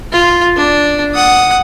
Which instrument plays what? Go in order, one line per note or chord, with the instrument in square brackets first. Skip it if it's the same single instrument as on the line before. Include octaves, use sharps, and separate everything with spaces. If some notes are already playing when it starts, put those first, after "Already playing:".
[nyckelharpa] F4
D4
F#5 D#6